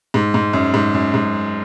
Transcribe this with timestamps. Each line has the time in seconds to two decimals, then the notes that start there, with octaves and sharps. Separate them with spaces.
0.14 G#2
0.34 G#2
0.53 F#2
0.74 G#2
0.94 F#2
1.14 G#2